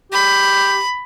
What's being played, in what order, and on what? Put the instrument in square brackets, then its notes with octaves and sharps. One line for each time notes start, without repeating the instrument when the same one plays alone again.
[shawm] G4 [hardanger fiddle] B5